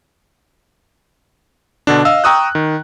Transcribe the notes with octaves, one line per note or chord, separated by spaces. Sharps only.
B2 D3 D4
D#5 F5 E6
G5 A#5 C#6 D#6 E6 F#6
D#3